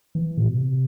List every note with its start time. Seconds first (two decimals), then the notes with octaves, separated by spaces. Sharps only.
0.15 E3
0.37 A2
0.46 B2
0.53 C3